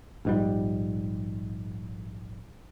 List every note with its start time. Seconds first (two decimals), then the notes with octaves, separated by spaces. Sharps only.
0.25 A#1 G#2 G3